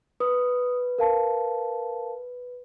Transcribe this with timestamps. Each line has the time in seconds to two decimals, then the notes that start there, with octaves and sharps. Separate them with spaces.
0.20 B4 D#6
0.98 A#4 F5 A5